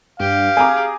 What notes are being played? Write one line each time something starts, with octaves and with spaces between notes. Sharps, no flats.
G2 G4 F5
G#4 G#5 A#5 D6